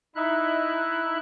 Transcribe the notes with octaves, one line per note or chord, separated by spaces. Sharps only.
D#4 E4 E5 F#6